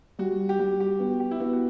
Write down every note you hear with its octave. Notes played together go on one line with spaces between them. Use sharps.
G3 F#4
G4
G3 F#4
G4
B3 F#4
G4
E4
B3 F#4
F#4